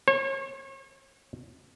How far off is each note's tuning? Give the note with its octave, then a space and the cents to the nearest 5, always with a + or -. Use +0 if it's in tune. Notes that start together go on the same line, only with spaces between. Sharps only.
C#5 -40